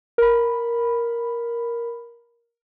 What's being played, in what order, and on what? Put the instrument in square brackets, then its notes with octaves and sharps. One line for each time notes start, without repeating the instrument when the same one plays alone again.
[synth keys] A#4 B5